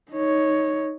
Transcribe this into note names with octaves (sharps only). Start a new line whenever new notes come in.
D#4 C#5